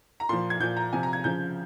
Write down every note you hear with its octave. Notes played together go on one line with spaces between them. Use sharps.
A#5
A#2 F3 C6
G#6
A#2 F3 G6
A#5
C3 F3 G#5
A#5
G#6
C#3 F3 G6